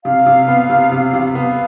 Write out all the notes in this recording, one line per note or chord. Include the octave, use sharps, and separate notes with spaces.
C3 F5
C3
B3
C3
C3
C3
B3 F5